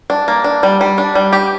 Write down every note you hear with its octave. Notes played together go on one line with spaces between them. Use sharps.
D4
A#3
D4
G3
G3
D4
G3
G4